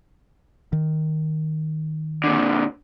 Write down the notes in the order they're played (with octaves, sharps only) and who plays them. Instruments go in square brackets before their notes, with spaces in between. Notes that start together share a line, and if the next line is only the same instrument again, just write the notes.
[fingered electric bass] D#3
[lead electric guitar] A#2 D3